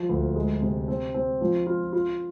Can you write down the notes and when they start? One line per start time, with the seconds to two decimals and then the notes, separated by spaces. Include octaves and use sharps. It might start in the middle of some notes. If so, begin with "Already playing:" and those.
Already playing: F3
0.09 D2
0.36 G#3
0.62 C3
0.88 C4
1.14 C4
1.41 F3
1.67 F4
1.93 F4